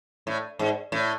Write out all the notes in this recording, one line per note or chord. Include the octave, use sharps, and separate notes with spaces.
A2
G#2
A2